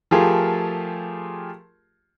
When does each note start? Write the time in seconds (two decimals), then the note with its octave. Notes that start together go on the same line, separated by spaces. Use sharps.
0.11 F3 A3 F4 G4 G#4 A#4